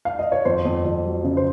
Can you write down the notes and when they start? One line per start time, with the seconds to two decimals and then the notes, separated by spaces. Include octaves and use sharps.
0.05 F5
0.19 D#5
0.32 C#5
0.45 F2 C5
0.65 F2
0.85 F2
1.05 F#3
1.24 C#3
1.37 C5